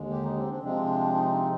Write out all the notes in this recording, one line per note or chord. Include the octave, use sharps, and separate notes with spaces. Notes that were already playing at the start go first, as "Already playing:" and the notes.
Already playing: D#2 D3 G#3
G4
D#4
C4
D4
C3 F3 G#3 C4 D4
D#4